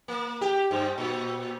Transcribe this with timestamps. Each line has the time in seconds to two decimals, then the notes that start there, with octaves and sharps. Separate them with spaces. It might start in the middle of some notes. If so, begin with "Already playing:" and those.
0.08 A#3
0.41 G4
0.71 G2
0.98 A#2